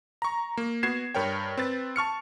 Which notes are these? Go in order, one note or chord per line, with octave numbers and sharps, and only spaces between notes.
A#5 C#6
A#3
B3 F#4 G#6 C7 E7
G2 A#4 C#5 G5
C4 B4 A6
A5 C#6 F6 C#7